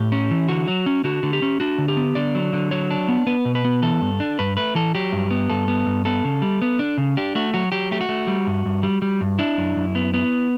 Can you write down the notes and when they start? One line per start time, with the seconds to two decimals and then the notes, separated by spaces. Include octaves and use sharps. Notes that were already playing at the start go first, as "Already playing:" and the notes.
Already playing: A2 G4
0.12 C#4
0.31 E3
0.49 D3 F#4
0.68 F#3
0.86 C#4
1.04 D3 F#4
1.23 D3
1.33 G4
1.42 C#4
1.60 D4 F#4
1.78 D3
1.88 G4
1.97 B3
2.15 D3 D5
2.35 F#3
2.53 D3
2.71 F#3 C#5
2.91 D4
3.08 B3
3.27 B3 B4
3.45 B2
3.55 B4
3.65 B3
3.82 E3 A4
4.01 G2
4.20 D4
4.39 G2 B4
4.57 A3 B4
4.75 E3 A4
4.95 F#3 G4
5.12 G2
5.31 B3
5.50 G2 A4
5.68 B3
5.86 G2
6.05 B3 A4
6.25 C#3
6.42 G3
6.62 B3
6.79 D4
6.98 C#3
7.17 D4 G4
7.35 A3 F#4
7.54 F#3 F#4
7.72 F#3 G4
7.91 A3 G4
8.01 F#4
8.09 A3
8.27 G3
8.47 G2
8.66 G2
8.83 G3
9.02 G3
9.21 G2
9.39 D4 E4
9.58 F#2
9.76 F#2
9.95 B3
10.14 B3